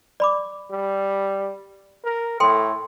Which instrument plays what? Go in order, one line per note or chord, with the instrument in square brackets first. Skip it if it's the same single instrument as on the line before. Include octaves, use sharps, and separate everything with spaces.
[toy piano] D5 B5 D6
[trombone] G3
A#4
[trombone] A2 [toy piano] A4 G5 C6